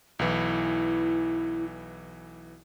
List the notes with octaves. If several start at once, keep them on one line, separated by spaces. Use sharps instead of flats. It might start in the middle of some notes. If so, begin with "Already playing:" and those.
B1 E3 E4